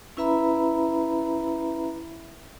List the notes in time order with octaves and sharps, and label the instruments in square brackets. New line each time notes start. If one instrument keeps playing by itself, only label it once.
[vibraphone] C#4 E4 B4 E5 A#5 B5